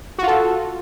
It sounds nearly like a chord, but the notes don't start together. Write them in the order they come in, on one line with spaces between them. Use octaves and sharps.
F#4 F4 A4